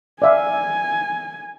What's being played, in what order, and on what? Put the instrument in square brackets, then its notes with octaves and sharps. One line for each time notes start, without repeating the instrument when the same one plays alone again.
[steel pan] D5 E5 F5 [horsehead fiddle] G#5